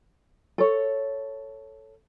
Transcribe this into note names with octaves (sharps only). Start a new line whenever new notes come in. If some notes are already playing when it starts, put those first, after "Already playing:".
A4 C#5